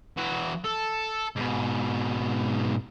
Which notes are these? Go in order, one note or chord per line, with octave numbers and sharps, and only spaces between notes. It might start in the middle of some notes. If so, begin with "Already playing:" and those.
E3 F#4
A4
G#2 B2